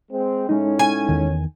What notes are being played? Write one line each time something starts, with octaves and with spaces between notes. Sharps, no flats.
G#3 C4
A2 G#3 C#4 D#4
G#5
E2 D#3